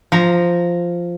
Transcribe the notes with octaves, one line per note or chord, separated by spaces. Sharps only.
F3 A#5